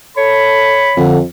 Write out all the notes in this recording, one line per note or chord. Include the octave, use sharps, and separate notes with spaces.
A4 C#5 B5
F2 D3